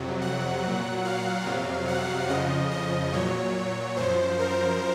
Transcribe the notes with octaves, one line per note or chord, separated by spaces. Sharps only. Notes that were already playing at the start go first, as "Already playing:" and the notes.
Already playing: F2 C3 F#3
F#5
A#2 F#3
F5
F2 C3 F#3
F#5
F2 C#3 F3 D#5
D#5
A#2 F#3 C#5
F#2 F3 C5
A#4